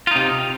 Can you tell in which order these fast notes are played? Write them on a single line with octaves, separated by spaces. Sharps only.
F4 D#4 C3